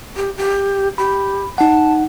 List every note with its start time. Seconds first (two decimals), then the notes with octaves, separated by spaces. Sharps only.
0.17 G4
0.37 G4
0.98 G4 B5
1.58 D#4 F#5 A5